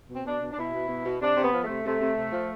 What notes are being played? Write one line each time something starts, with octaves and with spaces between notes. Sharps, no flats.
B2
C4
B2 D4
B2
D4
B2 E4
B2
B2
B2
C3 D4
C3
B3
F3
A3
C3
C3 A3
C3
C3
F3